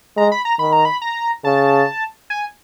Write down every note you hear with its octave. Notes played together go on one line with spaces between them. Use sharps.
G#3 A#5
B5
A#5
D#3 B5
A#5
B5
A#5
C#3 A5
G#5